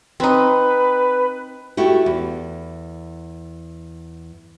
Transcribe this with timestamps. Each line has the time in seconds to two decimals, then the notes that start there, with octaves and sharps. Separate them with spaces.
0.20 C4 D#4 B4
1.77 A3 E4 F#4 G4
2.06 E2